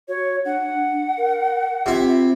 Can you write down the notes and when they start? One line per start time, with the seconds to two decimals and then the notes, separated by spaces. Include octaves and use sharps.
0.08 F#4 C#5
0.45 D4 F#5
1.17 A#4
1.86 C3 E4 F4